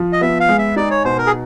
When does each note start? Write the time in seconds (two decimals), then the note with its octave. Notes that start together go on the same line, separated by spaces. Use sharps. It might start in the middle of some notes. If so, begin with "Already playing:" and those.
Already playing: F3
0.13 D#5
0.21 B3 E5
0.40 F5
0.49 G#3
0.58 E5
0.76 D#4 D5
0.91 C#5
1.05 B2 C5
1.18 A#4
1.26 G#4